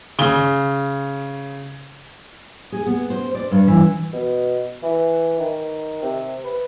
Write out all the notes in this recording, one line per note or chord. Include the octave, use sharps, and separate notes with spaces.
C#3 G7
G#4
B3
C5
D5
G2
E3
B2
E3
D#3
C3
B4